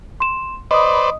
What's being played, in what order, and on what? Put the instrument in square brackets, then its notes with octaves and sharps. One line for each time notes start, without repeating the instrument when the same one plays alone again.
[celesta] C6 E7
[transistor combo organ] B4 C5 D5 [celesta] D#5 D#6